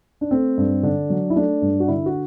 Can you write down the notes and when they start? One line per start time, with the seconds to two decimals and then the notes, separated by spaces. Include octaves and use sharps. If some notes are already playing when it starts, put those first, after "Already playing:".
0.21 D4
0.31 A3 C4
0.58 G2
0.83 D3 D4
1.10 F#3
1.30 E4
1.36 A3 D4
1.62 G2
1.80 F#4
1.88 D3 E4
2.06 F#4